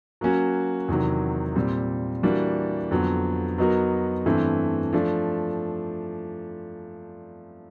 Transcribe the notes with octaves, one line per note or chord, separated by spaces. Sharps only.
F#3 A#3 C#4 F#4
E2 C3 D#3 F#3
A#2 G3 C4
E3 G3 A#3 D4 F#4
F2 D3 F#3 B3
F#3 B3 D#4 F#4 A#4
G2 E3 A3 C4
F3 A3 D4